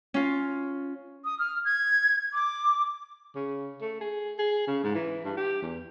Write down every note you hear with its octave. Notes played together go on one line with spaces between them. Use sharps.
C#4 F4
D#6
F6
G#6
D6
C#3
A3
G#4
G#4
C#3
G#2
E3
G2
G4
E2